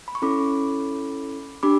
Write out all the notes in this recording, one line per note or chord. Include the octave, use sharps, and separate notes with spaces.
B5
C#6
C#4 E4 A4 B5 D6
D4 G4 B5 D6